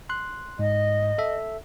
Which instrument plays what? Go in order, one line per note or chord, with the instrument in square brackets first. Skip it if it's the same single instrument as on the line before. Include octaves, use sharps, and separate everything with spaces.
[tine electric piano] C6 F#6
[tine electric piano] G#2 [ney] D#5
[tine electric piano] A4 E5